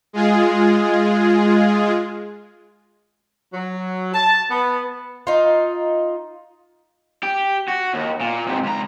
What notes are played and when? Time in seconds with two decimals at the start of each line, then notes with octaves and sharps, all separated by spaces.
0.13 G#3 F4 G#4
3.54 F#3
4.14 A5
4.50 B3
5.27 D#4 F4
7.23 G4
7.68 F#4
7.94 D#2
8.21 A#2
8.47 G#2 C3
8.63 C#2 A#5